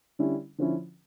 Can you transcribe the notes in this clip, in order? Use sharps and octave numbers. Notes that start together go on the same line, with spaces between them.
D3 G3 C#4 E4
D3 F3 C#4 E4